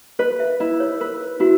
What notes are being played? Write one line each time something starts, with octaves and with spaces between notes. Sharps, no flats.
B4 D#5
E5
E4 D#5
C#5
A#4 B4
E4 F#4